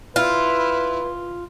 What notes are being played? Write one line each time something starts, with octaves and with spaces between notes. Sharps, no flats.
E4 F4 B4